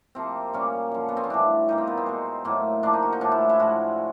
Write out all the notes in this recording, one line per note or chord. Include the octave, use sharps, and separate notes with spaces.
C3 F3 A#3 C4
A#2 G3 A#3 C#4
F#2 D3 F3
B3
C4
C#4
A2 E3 G3 D4
A#2 G3 A#3 D#4
C4
B3
C4
B2 G#3
A2 F#3 A#3
A#2 F3 A#3 D4
D#4
F#4
D#4
A2 F3 G#3 D4
E4
E4
A2 F3 G#3 F#4